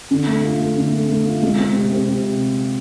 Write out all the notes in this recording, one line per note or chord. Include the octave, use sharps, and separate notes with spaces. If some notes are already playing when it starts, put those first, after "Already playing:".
D3
A3
F4
A3
D3
A3
A3
F4
G#3
C4
C3
C4
C3